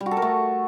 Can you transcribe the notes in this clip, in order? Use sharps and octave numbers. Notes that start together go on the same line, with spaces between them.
G3
F#4
A4
A#4
A3